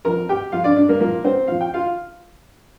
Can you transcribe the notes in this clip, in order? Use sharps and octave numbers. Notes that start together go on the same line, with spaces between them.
F2 F3 A#4 A#5
G4 G5
F2 F3 F4 F5
D4 D5
D4 D5
A#3 A#4
A#2 F3 A#3 A#4
C4 C5
A#2 F3 F5
G5
F4 F5